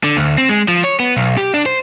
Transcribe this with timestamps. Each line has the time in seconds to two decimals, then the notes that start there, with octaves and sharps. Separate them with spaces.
0.04 D3
0.17 D2
0.38 C4
0.50 G#3
0.68 F3
0.84 C#5
1.00 B3
1.17 B1
1.37 G4
1.54 D4
1.66 C5